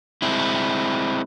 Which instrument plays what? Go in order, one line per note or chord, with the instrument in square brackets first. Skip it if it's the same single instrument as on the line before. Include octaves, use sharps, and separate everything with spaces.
[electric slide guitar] G#3 C4 E4